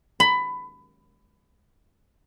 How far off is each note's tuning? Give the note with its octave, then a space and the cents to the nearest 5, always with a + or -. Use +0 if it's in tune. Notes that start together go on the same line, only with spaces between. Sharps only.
B5 +20